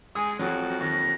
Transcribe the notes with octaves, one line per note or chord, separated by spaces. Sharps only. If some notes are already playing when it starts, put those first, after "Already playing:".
G#3 G#5 D#6
F2 F#3 F#4
D#2 A#6